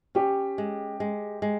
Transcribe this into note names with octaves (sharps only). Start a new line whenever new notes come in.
C#4 G4
G#3
G#3
G#3